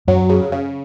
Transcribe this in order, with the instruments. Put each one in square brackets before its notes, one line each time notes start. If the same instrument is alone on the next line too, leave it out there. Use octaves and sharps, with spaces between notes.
[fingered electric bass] F#2 [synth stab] F#3
[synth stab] C#3
C#3